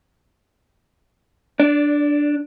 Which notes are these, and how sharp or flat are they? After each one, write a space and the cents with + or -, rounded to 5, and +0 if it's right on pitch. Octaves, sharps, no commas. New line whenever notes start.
D4 +0 D5 -25